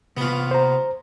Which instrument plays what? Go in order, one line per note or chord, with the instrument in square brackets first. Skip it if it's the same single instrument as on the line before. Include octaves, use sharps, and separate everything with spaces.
[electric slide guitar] C3 B4 [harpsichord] B3 F4
[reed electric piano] C5 A#5